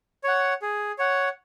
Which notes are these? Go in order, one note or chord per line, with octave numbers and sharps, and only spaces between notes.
C#5 F#5
G#4
C#5 F#5